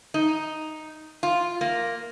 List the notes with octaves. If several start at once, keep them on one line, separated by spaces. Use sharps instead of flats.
D#4
F4
A#3